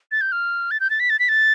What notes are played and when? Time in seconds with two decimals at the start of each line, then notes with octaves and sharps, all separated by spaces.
0.12 A6
0.21 G6
0.32 F6
0.71 A6
0.80 G6
0.90 A6
1.00 B6
1.10 A6
1.19 B6
1.29 A6